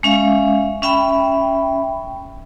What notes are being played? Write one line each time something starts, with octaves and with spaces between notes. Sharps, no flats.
G#3 C#4 E5 F5
C#4 E5 G5 B5